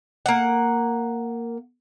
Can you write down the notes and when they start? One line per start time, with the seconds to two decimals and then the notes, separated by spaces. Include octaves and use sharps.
0.26 A#3 F#5